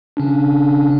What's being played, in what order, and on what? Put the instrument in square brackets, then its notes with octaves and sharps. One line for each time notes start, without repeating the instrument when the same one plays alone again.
[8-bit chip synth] C#3 C#4 D4